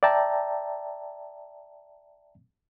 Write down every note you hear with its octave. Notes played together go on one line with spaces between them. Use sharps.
D5 E5 G5 A5 A#5